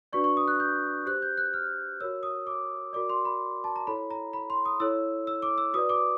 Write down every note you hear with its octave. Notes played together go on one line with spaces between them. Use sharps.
D4 F#4 B4 D5 C#6
C#6
D#6
F#6
G6
G4 C5 F#6
G6
F#6
F6
F#4 A#4 C#5 E6
D#6
D6
F#4 A#4 D5 D6
C6
B5
A5
A#5
E4 A4 C#5 B5
A#5
B5
C6
D#6
E4 A4 C#5 E6
E6
D6
E6
F#4 B4 D5 D#6
D6